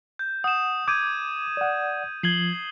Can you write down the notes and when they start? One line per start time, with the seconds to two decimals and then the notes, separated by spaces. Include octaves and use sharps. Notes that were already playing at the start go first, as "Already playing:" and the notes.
0.19 G6
0.44 F#5 D#6 E7
0.88 D6 G6 G#6 D#7
1.57 D5 F#5
2.23 F3 G#6 C7 F#7 G7